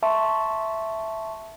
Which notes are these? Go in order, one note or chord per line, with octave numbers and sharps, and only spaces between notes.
E5 A5 C6 C#6